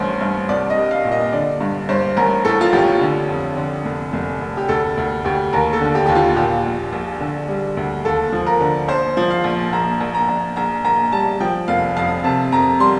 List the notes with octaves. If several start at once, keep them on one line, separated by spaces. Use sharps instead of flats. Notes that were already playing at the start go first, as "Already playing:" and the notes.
Already playing: A1 G2 C5
G2
C2 D5
D#5
G3
F5
A#2
D#5
D3 D5
G2
G2 C5
A1 A#4
A2 A4
F4
A1 G4
D3
F2
D3
F1
F1
F1
G4
D2 A4
D2
D2 G4
D#2 A#4
A4
D3
G4
D#2 G4
F4
A#2 G4
A#1
A#1
D3
G3
D2
D#2 A4
F3
A#4
D3
A#1 C5
F3
F5
A#1
A#1 A#5
A#1
A#5
A#1
A#1 A#5
A#1 A#5
G3 A5
F3 G5
F1 F5
F2 F5
C3 A5
F2 A#5
G3 C6